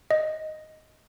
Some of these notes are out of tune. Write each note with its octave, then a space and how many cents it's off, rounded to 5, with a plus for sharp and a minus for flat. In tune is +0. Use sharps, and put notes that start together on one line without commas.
D#5 +5